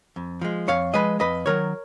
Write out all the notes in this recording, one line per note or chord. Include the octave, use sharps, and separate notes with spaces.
F2
F3 G#3
F2 C#5 F5
F3 G#3 B4 D#5
F2 B4 D#5
D#3 F#3 A#4 C#5